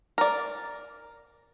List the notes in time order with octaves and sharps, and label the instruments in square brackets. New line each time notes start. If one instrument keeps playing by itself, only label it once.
[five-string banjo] A#4 D5